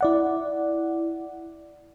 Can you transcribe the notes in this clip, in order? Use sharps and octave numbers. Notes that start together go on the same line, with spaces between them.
E4 D5 F#5